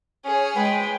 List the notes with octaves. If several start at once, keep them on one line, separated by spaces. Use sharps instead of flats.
C#4 G#4 C#5
G#3 B4 G5